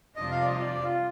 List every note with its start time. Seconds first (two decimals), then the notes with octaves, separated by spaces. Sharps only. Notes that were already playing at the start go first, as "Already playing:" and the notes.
0.16 F2 C3 G3 D4 F4 D#5
0.31 F5
0.41 D5
0.46 D#5
0.60 D5
0.83 F4